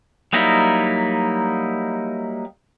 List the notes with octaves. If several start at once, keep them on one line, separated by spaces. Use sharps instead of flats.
F#3 G3 A#3 D#4 E4